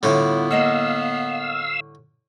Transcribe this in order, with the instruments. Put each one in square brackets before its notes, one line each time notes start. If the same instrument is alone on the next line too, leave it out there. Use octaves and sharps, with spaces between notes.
[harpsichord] A2 D3 G3 [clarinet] B3 [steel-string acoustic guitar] E4 F4 C#5
[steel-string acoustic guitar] A#3 D#5 F#5 [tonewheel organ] F5 E6